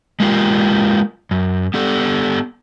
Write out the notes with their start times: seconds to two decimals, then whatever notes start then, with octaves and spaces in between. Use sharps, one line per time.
0.20 G#3 A#3 F4 G4
1.31 F#2
1.74 B3 G4 A4